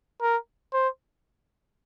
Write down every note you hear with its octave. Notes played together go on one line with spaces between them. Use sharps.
A#4
C5